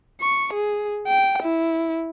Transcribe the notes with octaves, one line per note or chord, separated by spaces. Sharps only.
C#6
G#4
G5
E4